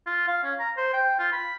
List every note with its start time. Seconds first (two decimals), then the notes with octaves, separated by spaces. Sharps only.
0.06 F4
0.27 F5
0.43 C#4
0.59 A#5
0.77 C5
0.93 G5
1.19 F4
1.32 B5